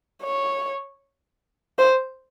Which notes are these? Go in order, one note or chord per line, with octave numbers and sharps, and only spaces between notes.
C#5
C5